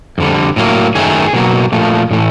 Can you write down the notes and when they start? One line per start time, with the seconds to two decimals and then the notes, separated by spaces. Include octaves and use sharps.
0.18 F2 D3 G3
0.56 A2 F#3 A#3
0.95 F#2 D#3 F#3 A3 G#4
1.33 B2 F#3 A#3
1.72 A#2 F3 A3
2.11 A2 E3 A3